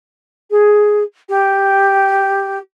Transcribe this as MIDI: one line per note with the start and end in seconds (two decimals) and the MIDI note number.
0.50 1.03 68
1.29 2.58 67